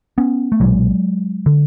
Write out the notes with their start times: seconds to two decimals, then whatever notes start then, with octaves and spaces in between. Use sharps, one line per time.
0.18 B3 C#4
0.52 A3
0.60 B1 A#2 F#3 G#3
1.46 D3